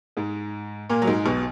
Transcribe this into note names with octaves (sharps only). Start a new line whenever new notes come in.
G#2 G#3
A#2 A#3
F#3
G#2 G#3
B1 B2